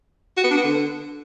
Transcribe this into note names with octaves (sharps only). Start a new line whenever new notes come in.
F#4
B3
D4
B3
D3